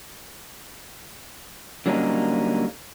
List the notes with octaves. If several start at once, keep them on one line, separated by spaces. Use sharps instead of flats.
D3 F#3 G3 A#3 C#4 D#4